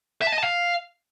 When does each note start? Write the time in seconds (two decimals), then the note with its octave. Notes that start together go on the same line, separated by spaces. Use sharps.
0.22 E5
0.27 A5
0.32 D#5
0.38 A5
0.43 F5